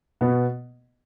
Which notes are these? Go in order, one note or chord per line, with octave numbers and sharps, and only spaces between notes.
B2 B3